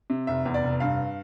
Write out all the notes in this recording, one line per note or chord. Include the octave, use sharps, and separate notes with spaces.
C3
F1 E5
E2
D5
F1
G2 F5